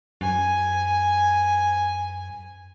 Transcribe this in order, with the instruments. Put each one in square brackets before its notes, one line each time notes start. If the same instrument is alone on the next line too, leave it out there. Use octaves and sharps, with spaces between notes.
[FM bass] F#2 [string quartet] G#5